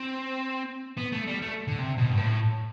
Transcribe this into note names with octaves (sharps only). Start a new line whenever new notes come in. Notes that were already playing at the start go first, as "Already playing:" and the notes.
Already playing: C4
B3
A3
G3
A3
D3
C3
B2
G2
A2